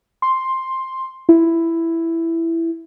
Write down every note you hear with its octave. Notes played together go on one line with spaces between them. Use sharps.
C6
E4